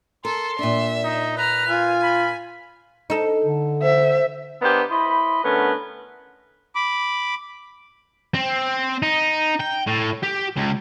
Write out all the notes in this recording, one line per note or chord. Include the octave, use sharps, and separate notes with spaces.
A4 A#4 C6
A#2 D4 E5
D#4
B4 A#5 F6
F4 G#5
B5
D#4 A4
D3
C5 E5
B3 D4 G4 A#4 C5 D#5
E4 C5 D#5 B5
D3 A3 B3 C#4 A#4 B4
B5 D6
C4
D#4
G5
A2
G4
C#2